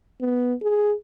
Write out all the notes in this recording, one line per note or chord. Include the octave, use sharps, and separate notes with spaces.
B3
G#4